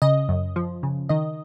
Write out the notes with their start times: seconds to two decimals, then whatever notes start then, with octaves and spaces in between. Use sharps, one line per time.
0.02 C#3 D#5
0.29 F#2
0.56 F3
0.83 C#3
1.09 D#3 D#5